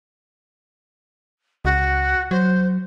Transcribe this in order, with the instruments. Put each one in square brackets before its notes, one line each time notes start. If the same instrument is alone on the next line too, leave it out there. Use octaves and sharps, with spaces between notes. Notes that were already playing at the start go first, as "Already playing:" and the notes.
[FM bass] C#2 [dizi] F#4
[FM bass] F#3 [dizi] C5